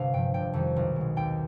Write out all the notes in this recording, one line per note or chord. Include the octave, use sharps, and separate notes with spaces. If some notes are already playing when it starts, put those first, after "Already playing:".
Already playing: G1 C3 F5
G2 F3 G5
F1 G5
F2 D#3 G3
B1
B2 G#3
D#2 G5